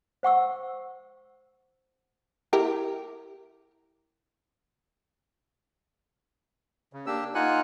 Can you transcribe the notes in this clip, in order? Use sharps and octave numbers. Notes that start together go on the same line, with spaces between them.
C5 F#5 C#6 E6
E4 G4 A#4
C#3
A#3 D4 G4 E6
A#3 D#4 F4 F#5 G#5 F#6